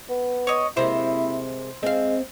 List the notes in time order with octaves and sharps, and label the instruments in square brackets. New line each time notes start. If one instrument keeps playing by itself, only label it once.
[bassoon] B3
[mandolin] C#5 D#5
[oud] C3 G#3 A#3 [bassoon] E4 [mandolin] C5
[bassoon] G#3 [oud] C4 F5